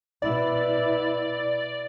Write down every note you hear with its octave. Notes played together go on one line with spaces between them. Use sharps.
B2 E4 D5